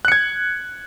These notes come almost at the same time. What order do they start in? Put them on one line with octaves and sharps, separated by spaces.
F#6 C#7 G#6